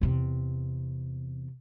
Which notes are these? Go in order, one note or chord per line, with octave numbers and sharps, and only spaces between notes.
E2 C3